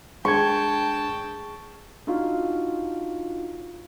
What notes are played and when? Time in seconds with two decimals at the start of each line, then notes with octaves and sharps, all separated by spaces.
0.25 G#3 D4 G5 A5 C#6 G#6
2.07 D4 D#4 F4 F#4 F5